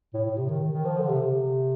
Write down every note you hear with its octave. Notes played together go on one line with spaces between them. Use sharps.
A2
A2
C3
D#3
D#3
D#3
F3
D3
C3
C3